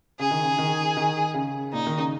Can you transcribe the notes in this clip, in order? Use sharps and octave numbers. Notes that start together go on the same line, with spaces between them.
C#3 G#4
D#3
C#3
D#3
D#3
C#3
A#2 D#4
D#3
C#3